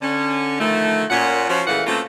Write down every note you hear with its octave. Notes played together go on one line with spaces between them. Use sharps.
D3 C#4
D3 D#3 F3 A3
A#2 C#4 F#5
F3 C#4 F#4
A#2 C#3 E3 A3 F5 F#5
B2 A3 A#3 C4 C#4 F4